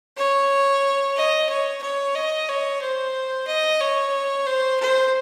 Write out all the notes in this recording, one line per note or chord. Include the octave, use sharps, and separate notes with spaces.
C#5
D#5
C#5
C#5
D#5
C#5
C5
D#5
C#5
C5
C5